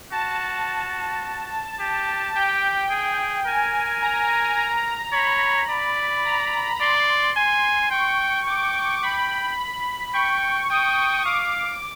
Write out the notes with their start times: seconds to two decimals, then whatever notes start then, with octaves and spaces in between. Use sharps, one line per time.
0.12 F#4 A5
1.80 G4
2.35 G4 G5
2.90 G#4 G5
3.46 A#4 G#5
4.02 A#5
4.57 A#5
5.13 C#5 B5
5.70 D5
6.25 A#5
6.80 D5 C6
7.36 G#5
7.91 G5 C#6
8.47 G5 D6
9.03 G5 B5
10.14 G5 C#6
10.70 G5 D#6
11.25 F5 D6